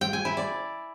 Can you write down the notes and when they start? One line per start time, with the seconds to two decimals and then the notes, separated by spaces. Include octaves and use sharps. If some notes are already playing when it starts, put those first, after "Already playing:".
0.01 G5
0.13 G#5
0.25 E4
0.37 D5